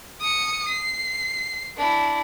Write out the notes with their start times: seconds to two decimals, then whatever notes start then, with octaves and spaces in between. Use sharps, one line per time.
0.21 D#6 C#7
0.68 C7
1.77 D4 E4